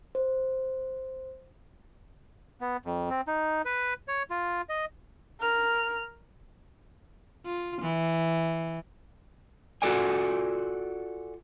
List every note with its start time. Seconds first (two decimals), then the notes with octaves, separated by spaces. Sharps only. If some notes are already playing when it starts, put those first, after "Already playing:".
0.15 C5
2.61 B3
2.85 F2
3.10 C4
3.27 D#4
3.65 B4
4.08 C#5
4.30 F4
4.69 D#5
5.40 A#4 F6
7.46 F4
7.82 E3
9.82 F4 F#4 A4 D5 G#5